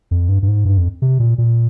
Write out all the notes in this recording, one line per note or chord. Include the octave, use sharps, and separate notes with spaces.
F2
G2
G2
G#2
G2
F2
C3
A#2
A#2